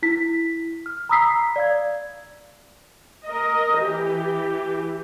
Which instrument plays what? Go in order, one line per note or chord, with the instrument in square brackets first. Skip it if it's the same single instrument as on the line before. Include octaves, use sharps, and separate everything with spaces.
[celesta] E4 B6
F6
A#5 B5 D#6 E6 B6 C7
D5 F5 G#6
[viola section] A#4 D#5
E3 G4